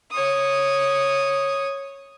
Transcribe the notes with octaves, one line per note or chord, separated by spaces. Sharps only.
C#5 D#6